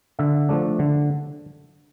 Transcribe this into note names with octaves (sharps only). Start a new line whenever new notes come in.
D3 E5
F3 A3 D4
D3